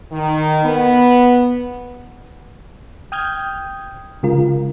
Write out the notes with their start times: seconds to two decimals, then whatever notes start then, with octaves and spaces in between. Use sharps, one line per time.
0.11 D#3
0.64 B3
3.12 G5 D#6 F6 G6 G#6
4.23 C#3 G#3 F4 A#4